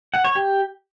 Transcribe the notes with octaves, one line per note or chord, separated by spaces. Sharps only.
F#5
C#5
G4